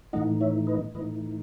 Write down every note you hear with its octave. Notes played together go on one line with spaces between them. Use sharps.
A2 E3 A3 D#4 D#5 F#5
C#5 E5
B4 D#5
A2 E3 A3 D#4 B4 D#5